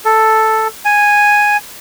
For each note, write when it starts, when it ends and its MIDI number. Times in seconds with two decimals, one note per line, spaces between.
0.05 0.68 69
0.85 1.57 80